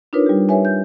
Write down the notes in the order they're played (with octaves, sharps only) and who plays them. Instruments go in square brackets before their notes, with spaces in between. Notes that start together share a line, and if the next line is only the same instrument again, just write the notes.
[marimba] D4 D#4 F4 A#4 B4 C#5
G3 G4
G4 B4 C#5 E5 G#5
G6